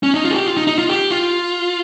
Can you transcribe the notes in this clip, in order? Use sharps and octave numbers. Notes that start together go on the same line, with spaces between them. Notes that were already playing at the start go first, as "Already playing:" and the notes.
C#4
D#4
F4
G#4
G4
F4
D#4
D#4
F4
G4
F4